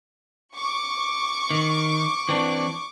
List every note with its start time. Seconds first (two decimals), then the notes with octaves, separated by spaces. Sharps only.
0.54 C#6 D6
1.50 D#3
2.29 E3 C4 D4